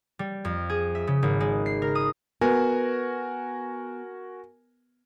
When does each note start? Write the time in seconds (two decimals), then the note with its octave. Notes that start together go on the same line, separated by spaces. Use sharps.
0.19 G3
0.45 F2
0.69 G#4
0.95 E5
1.07 C#3
1.23 G#1
1.41 G#3
1.66 C7
1.82 A#4
1.95 D#6
2.41 B3 F#4 A#4 G#5